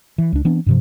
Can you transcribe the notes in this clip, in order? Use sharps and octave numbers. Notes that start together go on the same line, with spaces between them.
E3
C#2 D4
E3 B3 C4 D4
G2 C3 F3